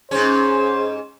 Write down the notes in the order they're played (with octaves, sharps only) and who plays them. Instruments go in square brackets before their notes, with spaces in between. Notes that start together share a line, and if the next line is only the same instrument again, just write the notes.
[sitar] G#2 C#4 [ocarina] G#4 [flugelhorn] C5